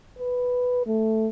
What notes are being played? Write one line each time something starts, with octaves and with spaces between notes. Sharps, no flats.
B4
A3